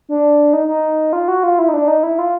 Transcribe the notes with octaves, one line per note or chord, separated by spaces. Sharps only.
D4
D#4
D#4
F4
F#4
F4
E4
D#4
D4
D#4
E4
F4